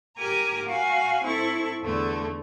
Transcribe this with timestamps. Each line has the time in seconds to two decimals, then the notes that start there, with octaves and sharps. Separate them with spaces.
0.18 G4 A#4 G#5 A#5 D6
0.66 F#4 F5 G#5
1.24 C4 E4 A4 C#6
1.82 E2 D3 A3